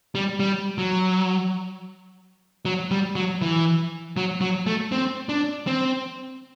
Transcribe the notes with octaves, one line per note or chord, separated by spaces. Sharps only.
G3
G3
F#3
F#3
G3
F#3
E3
F#3
F#3
A3
C4
D4
C4